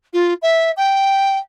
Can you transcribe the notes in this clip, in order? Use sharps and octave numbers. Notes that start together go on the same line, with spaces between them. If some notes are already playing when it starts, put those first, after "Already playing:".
F4
E5
G5